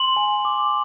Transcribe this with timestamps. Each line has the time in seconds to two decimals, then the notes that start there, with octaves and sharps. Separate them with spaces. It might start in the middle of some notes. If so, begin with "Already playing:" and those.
Already playing: C6 F#7
0.17 G#5
0.45 D6